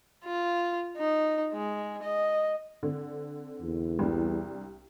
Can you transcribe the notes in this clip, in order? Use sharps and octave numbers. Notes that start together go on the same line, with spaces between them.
F4
D#4
G#3
D#5
D3 C4
E2
C2 D4